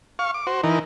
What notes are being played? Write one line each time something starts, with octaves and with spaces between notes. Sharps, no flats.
F5 C#6
D6
F#4 C5
E3 D#4 A#4